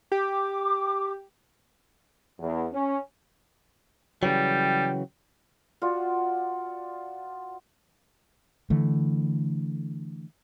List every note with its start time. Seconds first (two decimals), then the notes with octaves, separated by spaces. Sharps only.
0.12 G4 D6
2.38 E2
2.72 C#4
4.23 C#3 E3 F#3 G3 G5
5.82 F4 F#4 D5 F#5
8.70 D3 E3 A3